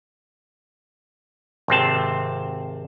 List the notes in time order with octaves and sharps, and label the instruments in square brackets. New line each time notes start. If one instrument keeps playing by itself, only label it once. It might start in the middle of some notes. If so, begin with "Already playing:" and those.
[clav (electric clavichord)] G#1 C3 C4 A5